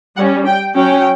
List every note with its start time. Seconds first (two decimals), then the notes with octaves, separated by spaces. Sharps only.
0.18 G3 C#4 F#5
0.47 G5
0.75 F#3 C#4 G5